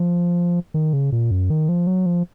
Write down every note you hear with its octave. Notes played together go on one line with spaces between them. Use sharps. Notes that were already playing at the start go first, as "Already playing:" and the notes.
Already playing: F3
D#3
C#3
A#2
F#2
D#3
F3
F#3
F3